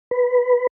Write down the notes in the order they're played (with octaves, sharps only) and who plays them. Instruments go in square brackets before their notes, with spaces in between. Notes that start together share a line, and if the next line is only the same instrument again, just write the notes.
[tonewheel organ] B4